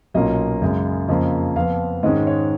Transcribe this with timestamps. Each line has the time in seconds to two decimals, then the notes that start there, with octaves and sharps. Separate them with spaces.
0.14 B1 A#2 F#3 A#3 C#4 D#5
0.62 F#2 C#3 G#3 C#4
1.08 F2 C#3 F3 A#3 D#5
1.56 F2 F3 B3 F5
2.03 G#2 D#3 G#3 C#4 D#5
2.27 C#5